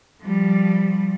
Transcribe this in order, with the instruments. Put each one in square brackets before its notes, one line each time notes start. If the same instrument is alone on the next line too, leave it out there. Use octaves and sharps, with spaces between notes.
[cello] F3 G3